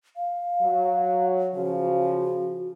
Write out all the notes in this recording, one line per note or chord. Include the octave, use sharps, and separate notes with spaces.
F5
F#3
C#3 F3 F#4